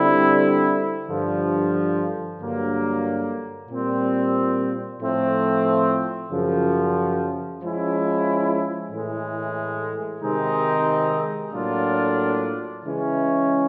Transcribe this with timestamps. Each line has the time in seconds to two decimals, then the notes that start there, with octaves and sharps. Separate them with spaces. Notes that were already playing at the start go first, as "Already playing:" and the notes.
Already playing: D3 G3 C4 E4
1.08 G2 D3 F3
2.39 G2 D3 F#3 A#3
3.69 A#2 G3 C4
5.00 A2 F3 A3 C4
6.31 F#2 C#3 F3
7.62 F3 G#3 C#4 E4
8.92 A2 E3 G#3
10.22 C3 D#3 G#3 C4 D#4
11.53 A2 F#3 A#3 D4 F4
12.83 C#3 E3 G#3 C#4 E4